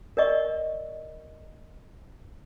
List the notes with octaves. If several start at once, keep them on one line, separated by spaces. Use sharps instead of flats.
A#4 D5 D#5 C#6